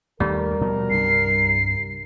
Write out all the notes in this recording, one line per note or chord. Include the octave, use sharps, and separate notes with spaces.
D#2 D#3 G3 A3 A#4
B2 F3 F#3
C2 G2 C7